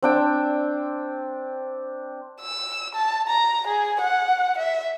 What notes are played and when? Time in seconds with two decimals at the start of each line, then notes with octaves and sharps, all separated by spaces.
0.02 C4 D4 G5
2.41 E6
2.95 A5
3.28 A#5
3.67 G#4
4.01 F#5
4.58 E5